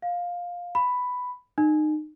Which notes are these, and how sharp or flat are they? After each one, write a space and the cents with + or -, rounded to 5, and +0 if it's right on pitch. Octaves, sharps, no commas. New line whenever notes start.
F5 +10
B5 +5
D#4 -25